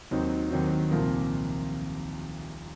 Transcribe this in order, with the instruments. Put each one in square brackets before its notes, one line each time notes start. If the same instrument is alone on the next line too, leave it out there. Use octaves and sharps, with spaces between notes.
[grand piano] D#2 D#3 F#3 C4 D#4
D#2 D#3 F#3 C4 D#4
C2 A#2 F3 A#3